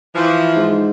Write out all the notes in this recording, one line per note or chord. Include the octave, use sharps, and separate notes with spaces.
E3 F3
G#2